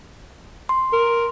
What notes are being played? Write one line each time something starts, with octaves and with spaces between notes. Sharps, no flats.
C6
A#4